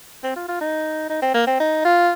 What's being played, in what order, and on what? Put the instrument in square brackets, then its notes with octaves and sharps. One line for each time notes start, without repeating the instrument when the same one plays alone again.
[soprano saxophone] C4
F4
F4
D#4
D#4
C4
A#3
C4
D#4
F4